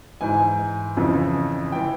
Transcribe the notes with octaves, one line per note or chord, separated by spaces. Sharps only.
G#2 E3 G#5
F2 C#3 E3
E3 G5